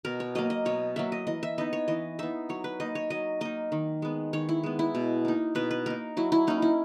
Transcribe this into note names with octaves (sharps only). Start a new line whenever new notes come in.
B2 A#4
C#5
F#3 A#3 D#5
D#5
B2 C#5
F#3 A#3 E5
D#5
E3 D#5
E5
B3 D#4 D#5
C#5
E3 D#5
B3 D#4 E5
F#3 C#5
B4
A#3 D#4 D#5
C#5
F#3 D#5
A#3 D#4 D#5
D#3
G#3 B3
D#3 C#5
E4
G#3 B3
E4
B2
A#3 D#4
B2 B4
B4
A#3 D#4 A#4
F#3 E4
E4
A#3 C#4 D#4
E4